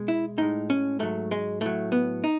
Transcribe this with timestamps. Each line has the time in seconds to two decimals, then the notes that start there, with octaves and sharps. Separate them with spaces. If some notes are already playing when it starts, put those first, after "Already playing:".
Already playing: B2 G#3
0.08 E4
0.38 A2 G#3 D#4
0.70 C#4
0.99 G#2 F#3 A3
1.31 G#3
1.61 A2 F#3 A3
1.92 B3
2.24 D#4